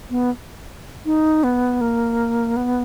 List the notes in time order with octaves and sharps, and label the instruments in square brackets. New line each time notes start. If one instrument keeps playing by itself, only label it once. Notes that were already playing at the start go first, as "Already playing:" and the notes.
[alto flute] B3
D#4
B3
A#3
B3